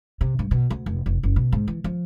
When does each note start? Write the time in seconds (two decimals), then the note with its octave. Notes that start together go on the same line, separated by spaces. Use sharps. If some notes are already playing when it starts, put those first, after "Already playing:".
0.21 C3
0.39 G2
0.51 B2
0.70 D2
0.86 F1
1.06 F1
1.23 F#1
1.36 B2
1.52 G#2
1.68 E3
1.84 F3